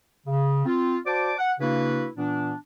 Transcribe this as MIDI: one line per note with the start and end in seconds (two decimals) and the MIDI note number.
0.27 0.65 49
0.65 0.98 60
0.65 0.98 65
1.06 1.33 66
1.06 1.33 72
1.06 1.33 74
1.06 1.33 81
1.06 1.33 86
1.39 1.52 78
1.60 2.07 49
1.60 2.07 58
1.60 2.07 62
1.60 2.07 64
1.60 2.07 66
1.60 2.07 71
2.17 2.54 46
2.17 2.54 52
2.17 2.54 59
2.17 2.54 62